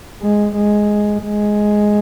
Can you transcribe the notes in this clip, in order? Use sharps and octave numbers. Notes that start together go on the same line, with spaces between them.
G#3
G#3
G#3